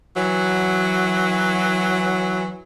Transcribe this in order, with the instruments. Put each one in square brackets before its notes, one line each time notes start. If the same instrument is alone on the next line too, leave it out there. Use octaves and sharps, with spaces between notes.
[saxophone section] E3 F#3